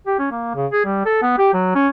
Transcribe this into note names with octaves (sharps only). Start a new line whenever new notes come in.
G4
C#4
A#3
C#3
G#4
G3
A4
B3
G4
F#3
C#4